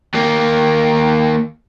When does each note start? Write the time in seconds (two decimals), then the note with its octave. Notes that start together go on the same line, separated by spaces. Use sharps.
0.14 D#2 A#3